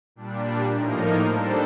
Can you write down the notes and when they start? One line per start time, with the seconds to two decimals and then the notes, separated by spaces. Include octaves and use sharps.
0.16 A#2 G3 D4
0.73 A2 F3 A#3 D#4 A#4
1.30 G3 D4 A4 C5